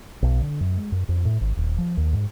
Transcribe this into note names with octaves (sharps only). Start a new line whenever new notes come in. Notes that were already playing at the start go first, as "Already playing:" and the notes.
B1
D3
F#2
G#3
F#2
F2
A2
G#1
D#1
F3
D#2
G#2